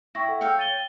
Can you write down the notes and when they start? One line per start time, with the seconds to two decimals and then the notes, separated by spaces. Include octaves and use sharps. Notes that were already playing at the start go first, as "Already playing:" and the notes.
0.15 E4 G5 C#6 A#6
0.29 A4 F#5
0.41 C#5 F5 G5 E6 G6
0.59 A6 D#7 G7